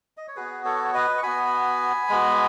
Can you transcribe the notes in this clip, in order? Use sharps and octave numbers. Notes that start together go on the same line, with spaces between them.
D#5
C#5
B3 F#4 G#4 B4
A4 C#5
C#5
B4 D#5
C#6
B3 F#4 G#5 B5
G#3 B3 F#4